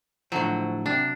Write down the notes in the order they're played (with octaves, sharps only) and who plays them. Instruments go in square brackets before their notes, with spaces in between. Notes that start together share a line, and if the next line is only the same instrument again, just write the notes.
[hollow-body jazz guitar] A2 D3 F3 [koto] F#3
[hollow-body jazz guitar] C3 [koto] D4